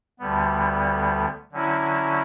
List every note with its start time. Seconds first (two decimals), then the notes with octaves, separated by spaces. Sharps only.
0.20 D2 D3 G3 B3
1.52 D3 F#3 C#4 E4